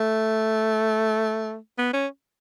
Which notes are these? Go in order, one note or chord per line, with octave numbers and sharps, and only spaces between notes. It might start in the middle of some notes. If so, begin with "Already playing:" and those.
Already playing: A3
B3
C#4